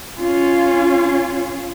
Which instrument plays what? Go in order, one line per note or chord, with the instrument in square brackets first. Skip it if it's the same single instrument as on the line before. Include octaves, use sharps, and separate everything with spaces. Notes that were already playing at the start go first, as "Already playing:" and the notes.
[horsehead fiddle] C#4 F4